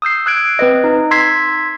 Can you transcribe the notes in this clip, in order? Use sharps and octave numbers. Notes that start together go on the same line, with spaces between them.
D#6 E6 G6 C7
E6 F#6 G#6 D7
C4 B4 D#5
D#4
C6 E6 G#6 B6 C7